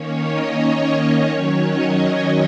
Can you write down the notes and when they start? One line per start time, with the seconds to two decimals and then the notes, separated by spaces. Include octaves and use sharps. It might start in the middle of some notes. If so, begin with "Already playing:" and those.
Already playing: D#3 A#3 C#4 C#5
0.22 D#5
0.57 C#5
0.93 C#5
1.28 D#3 F#3 C#4 C#5
1.64 D#5